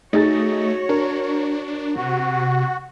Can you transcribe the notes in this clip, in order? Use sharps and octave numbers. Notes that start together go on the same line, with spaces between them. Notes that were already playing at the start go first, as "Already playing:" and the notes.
A3 D#4 F#4 G#4 C#5 A6
D4 A#4
C3 F#4